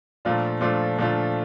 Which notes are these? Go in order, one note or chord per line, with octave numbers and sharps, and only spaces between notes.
A#2 F3 A3 D4 F4
A#2 F3 A3 D4 F4
A#2 F3 A3 D4 F4